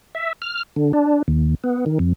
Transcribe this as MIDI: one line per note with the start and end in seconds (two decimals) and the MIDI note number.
0.15 0.33 76
0.42 0.63 89
0.76 0.92 50
0.93 1.22 62
1.28 1.55 39
1.64 1.85 59
1.86 1.98 51
1.99 2.13 41